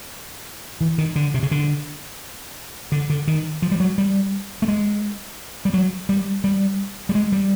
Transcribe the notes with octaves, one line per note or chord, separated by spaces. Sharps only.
E3
D#3
D3
C3
C#3
D3
D3
D3
D#3
F3
G3
F#3
G3
A3
G#3
G3
F#3
G3
G3
G3
G#3
G3